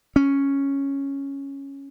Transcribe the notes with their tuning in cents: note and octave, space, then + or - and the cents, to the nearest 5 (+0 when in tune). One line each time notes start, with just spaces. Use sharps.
C#4 -5